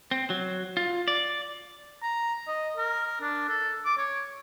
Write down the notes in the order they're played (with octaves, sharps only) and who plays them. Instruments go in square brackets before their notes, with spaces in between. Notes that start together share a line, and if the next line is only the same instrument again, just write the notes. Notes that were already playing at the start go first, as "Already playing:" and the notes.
[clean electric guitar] C4
F#3
F4
D5
[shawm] A#5
D#5
A#4
D4
A4
D6
C#5